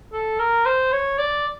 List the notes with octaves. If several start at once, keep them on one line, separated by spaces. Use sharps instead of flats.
A4
A#4
C5
C#5
D5